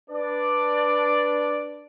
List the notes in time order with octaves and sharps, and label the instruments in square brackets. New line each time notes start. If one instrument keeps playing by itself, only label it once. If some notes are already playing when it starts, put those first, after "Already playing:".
[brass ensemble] D4 B4 D5